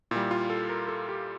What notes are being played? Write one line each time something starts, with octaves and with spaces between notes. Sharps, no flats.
A#2 G3 E4
F4
A4
A#4
A4
G4